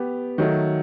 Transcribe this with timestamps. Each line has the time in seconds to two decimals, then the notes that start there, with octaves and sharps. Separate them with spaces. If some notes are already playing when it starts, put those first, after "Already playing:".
Already playing: B3 G4
0.38 D#3 F#3 A3